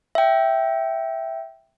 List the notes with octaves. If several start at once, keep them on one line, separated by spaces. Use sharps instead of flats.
E5 G5